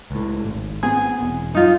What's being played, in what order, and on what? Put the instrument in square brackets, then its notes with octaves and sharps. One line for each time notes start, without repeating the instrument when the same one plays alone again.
[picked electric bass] C#2 A2
G#1
[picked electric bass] B3 C4 [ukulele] G#4
[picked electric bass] E1
[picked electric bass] F#2 [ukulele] D#4 F4